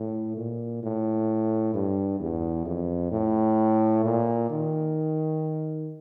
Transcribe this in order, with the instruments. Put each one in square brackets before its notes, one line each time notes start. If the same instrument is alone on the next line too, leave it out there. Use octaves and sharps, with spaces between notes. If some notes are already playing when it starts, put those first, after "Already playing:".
Already playing: [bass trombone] A2
A#2
A2
G2
E2
F2
A2
A#2
D#3